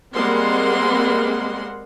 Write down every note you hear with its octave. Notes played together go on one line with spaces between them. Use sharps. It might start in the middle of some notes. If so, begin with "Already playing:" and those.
G3 G#3 A#3 C4 F#5 C6